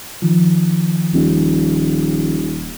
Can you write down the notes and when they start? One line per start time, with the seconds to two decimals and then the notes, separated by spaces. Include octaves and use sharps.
0.22 D#3 F3
1.14 D#1